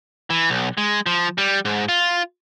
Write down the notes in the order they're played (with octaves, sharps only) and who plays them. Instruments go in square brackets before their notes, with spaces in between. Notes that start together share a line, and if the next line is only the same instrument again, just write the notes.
[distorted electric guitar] E3
B1
G#3
F3
G3
G#2
F4